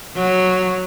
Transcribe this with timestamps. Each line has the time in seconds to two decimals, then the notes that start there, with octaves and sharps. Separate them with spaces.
0.16 F#3